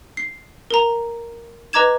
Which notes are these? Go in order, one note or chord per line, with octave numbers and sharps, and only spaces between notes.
C7
A#4 A#5
B4 D#5 A#5 D6 G#6 E7